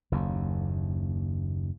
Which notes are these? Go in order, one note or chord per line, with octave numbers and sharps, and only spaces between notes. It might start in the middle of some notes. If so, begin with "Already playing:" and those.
F#1 D#2